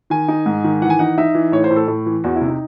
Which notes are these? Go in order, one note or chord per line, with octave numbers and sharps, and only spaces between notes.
D#3 G#5
D#4
G#2
D#3
E3 F#5
G#5
D#4 F#5
D#4 E5
E3
A2 C#5
C5
A2
A4
A2
E3
E2 F#4
E4
C3
D#4